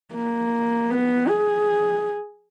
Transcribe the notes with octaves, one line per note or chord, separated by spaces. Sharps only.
A#3
B3
G#4